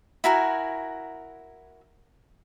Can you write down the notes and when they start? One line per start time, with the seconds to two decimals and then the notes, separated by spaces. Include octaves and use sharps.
0.24 E4 F#4 A#4 G#5